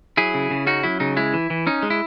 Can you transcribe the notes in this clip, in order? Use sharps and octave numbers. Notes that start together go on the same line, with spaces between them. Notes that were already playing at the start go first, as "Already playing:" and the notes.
F#3 E4 G#4
C#3
C#3
C#4 D#4 F#4
F#3 E4
C#3 D#4
G#3 E4
E3
E3
C#4 D#4
G#3
E4